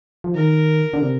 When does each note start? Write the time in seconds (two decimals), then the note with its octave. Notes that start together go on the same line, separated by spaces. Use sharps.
0.24 F3
0.35 D#3 A#4
0.93 D3
1.02 C3